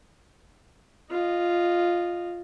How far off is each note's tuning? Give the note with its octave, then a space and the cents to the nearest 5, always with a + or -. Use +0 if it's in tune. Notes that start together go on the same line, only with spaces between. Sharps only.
F4 +0 D#5 -15